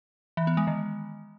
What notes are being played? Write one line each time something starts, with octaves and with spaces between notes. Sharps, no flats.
E3
B3
G#3
D#3